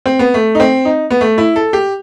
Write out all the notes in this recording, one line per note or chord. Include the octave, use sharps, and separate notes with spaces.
C4
B3
A3
D#4
C4
D#4
B3
A3
E4
A4
G4